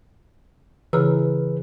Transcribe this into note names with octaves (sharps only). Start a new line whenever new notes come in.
C#3 E3 G#4 B4 A#5 E6